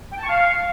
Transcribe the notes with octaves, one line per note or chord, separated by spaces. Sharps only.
G5
A5
C#6
F5